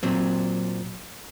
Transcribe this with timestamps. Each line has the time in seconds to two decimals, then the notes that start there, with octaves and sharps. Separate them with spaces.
0.03 A#2 F#3 C4